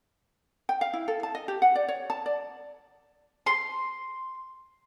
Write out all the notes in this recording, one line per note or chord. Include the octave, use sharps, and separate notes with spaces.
G5
F5
E4
A4
A5
D#5
G4
F#5
D5
C#5
A5
D5
C6